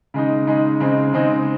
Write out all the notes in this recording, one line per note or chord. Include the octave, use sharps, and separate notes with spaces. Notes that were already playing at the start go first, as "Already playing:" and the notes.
C#3 G#3 D#4
C#3 G#3 D#4
C#3 G#3 C4 D#4
C#3 G#3 C4 D#4